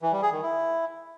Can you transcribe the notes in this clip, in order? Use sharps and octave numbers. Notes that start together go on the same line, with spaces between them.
E3
G3
G#4
D#3
E4